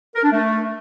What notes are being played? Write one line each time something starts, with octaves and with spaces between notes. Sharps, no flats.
A#4
D4
A3